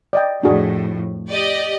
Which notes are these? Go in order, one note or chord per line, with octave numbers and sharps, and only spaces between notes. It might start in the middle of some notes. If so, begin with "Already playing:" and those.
D5 D#5 G5
F2 A2 D4 F#4 G#4
G4 D5 D#5